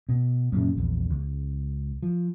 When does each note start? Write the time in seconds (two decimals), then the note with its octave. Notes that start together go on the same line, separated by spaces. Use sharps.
0.09 B2
0.52 F#2 A#2 C#3
0.75 A#1 E2
1.10 C#2
2.03 F3